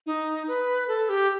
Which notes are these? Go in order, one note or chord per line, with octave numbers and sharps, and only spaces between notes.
D#4
B4
A4
G4